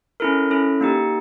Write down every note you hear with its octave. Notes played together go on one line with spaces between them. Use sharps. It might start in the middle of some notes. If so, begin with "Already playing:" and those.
C#4 E4 A4 A#4
C#4 E4 A4
A#3 D#4 G4